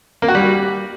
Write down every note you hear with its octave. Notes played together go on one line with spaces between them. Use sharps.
A#3
F#4
G3